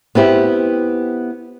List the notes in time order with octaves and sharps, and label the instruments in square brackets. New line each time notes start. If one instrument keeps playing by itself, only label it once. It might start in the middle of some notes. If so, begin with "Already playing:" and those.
[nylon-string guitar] B3 C4 E4 G4